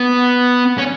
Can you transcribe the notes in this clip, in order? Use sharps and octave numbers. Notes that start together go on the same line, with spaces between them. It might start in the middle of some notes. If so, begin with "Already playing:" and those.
Already playing: B3
C#4